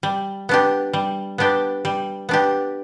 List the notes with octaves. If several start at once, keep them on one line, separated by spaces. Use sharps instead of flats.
G3
B3 D4 G4
G3
B3 D4 G4
G3
B3 D4 G4